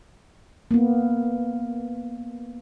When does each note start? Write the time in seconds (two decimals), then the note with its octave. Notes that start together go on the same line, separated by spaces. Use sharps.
0.71 A#3 B3